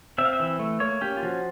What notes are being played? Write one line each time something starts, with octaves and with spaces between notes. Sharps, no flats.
C4 E5
F5
E5
E3
A3
A#3 C#5
C#4 G4
F4
F3 F#4